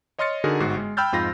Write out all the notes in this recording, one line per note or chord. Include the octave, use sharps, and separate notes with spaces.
C#5 D#5 C6 F6 A6 C#7
D3 D#4 F#4 G#4 A#4
G1 G#2 F#4 C7
G#3
G5 B5 E6 F6 G6 A6
F2 G#2 F4 B5 A#6